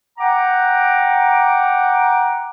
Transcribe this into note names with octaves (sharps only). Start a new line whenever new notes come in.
F#5 G5 A#5 D6